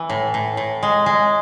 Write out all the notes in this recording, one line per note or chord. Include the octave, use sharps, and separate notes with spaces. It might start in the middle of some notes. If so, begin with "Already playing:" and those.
Already playing: E3
A2
A2
A2
G#3
G#3